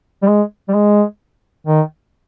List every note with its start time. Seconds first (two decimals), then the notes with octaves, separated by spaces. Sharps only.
0.23 G3
0.28 G#3
0.68 G3
0.75 G#3
1.67 D#3